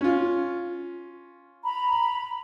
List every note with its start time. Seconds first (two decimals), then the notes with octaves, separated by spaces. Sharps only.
0.01 C#4 F4
1.64 A#5 B5